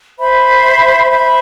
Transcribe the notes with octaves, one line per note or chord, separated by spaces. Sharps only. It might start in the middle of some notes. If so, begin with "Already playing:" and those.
C5 E5 B5
C5 E5 B5